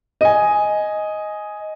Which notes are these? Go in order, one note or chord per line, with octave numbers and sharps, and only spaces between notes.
D#5 G#5